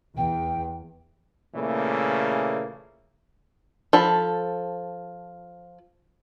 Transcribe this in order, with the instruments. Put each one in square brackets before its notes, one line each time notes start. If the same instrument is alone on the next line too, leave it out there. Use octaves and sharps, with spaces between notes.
[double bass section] E2 [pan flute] G5
[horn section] A#2 C#3 E3 A3 A#3
[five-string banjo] F3 A4 B5